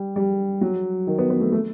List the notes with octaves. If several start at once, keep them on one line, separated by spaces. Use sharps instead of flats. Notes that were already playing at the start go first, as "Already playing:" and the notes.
Already playing: G3
G3
F#3
D#3
B3
B3
A3
A3